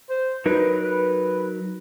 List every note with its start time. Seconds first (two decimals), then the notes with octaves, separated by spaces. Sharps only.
0.09 C5
0.46 F#3 D#4 A#4 B4
0.83 B4